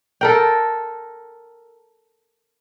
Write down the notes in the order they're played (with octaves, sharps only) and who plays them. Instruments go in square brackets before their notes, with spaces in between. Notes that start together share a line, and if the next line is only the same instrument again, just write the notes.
[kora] A4 A#4 G5